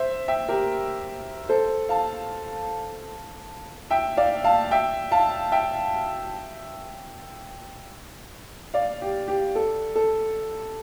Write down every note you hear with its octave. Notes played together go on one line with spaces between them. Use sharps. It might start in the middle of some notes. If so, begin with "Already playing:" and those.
Already playing: C5 E5
E5 G5
G4 A#4
A4 C5
F5 A5
E5 G5
D5 F5
F5 A5
E5 G5
F5 A5
E5 G5
D5 F5
G4
G4
A4
A4